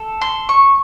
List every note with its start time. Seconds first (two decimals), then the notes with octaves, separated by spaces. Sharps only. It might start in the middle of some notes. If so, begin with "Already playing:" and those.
Already playing: A4
0.21 C6
0.49 C#6